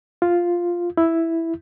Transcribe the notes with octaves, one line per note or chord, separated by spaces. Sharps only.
F4
E4